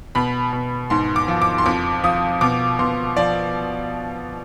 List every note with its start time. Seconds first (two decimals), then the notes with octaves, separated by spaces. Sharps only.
0.15 B2 B5
0.53 B2
0.90 G#2 C6
1.16 D6
1.28 F3
1.42 D6
1.58 C6
1.66 F2 D6
2.04 F3 D#6
2.41 B2 D6
2.79 B2 C6
3.17 F3 D5